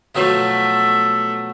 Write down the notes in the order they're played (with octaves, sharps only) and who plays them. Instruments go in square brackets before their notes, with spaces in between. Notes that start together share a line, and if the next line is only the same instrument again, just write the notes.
[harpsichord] B2 F3 F#3 [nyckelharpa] A3 E5